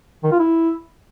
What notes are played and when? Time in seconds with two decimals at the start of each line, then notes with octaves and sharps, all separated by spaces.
0.24 D#3
0.32 F4
0.39 E4